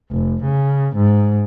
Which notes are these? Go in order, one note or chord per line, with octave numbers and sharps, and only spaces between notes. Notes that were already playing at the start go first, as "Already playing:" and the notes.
F1
C#3
G#2